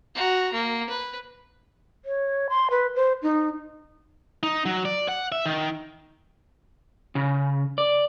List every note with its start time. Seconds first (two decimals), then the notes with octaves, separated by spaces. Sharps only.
0.15 F#4 A#5
0.53 A#3
0.89 B4
2.05 C#5
2.50 C6
2.71 B4
2.95 C5
3.23 D#4
4.43 D#4
4.65 F#3
4.85 D5
5.08 F#5
5.32 E5
5.46 D#3
7.15 C#3
7.78 D5